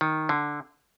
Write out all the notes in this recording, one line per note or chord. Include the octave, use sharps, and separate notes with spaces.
D#3
D3